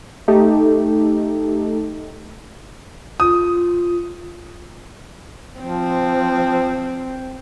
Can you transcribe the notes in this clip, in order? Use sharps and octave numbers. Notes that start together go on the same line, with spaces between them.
A3 D#4 G4 A4
F4 D#6
F3 C4